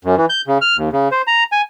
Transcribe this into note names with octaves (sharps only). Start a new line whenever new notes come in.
F#2
E3
G6
C#3
F6
D#2
C#3
C5
A#5
G#5